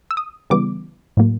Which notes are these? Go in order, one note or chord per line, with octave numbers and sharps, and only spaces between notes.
E6
D#6
C#3 E3 G3 B3 D6
A2 F#3 A#3